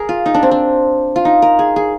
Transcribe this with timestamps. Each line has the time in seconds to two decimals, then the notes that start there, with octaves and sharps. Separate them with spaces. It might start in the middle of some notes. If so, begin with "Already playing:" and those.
Already playing: G#4 A#4
0.09 F4
0.26 D#4
0.34 D4
0.43 C4
0.51 D4
1.16 F4
1.25 D#4
1.42 A#4
1.59 G#4
1.76 G#4